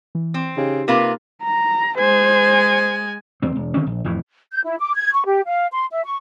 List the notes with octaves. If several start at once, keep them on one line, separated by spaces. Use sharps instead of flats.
E3
C4
C#3 D#4 G4
C3 A#3 F4 B4
A#5
G#3 C5 G#5
E2 C4
E1
D3 D#3 C4 C#4
A#1
F2 A2 E3
G6
E4
D6
G#6
C#6
G4
F5
C6
E5
C#6